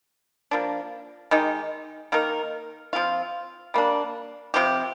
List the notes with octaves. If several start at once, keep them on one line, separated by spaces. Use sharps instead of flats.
F3 A#3 D4
D#3 G#3 D#4 G4
D#3 A#3 D#4 A#4
F3 C4 F4
G3 A#3 D4
C3 F3 C4 G4